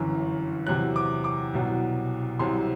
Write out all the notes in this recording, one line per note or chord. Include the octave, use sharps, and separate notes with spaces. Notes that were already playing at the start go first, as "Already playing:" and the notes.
Already playing: G1 F#2 E3
E2 C3 F#3 F#6
D6
D6
C2 B2 F#3
C2 C3 F#3 C6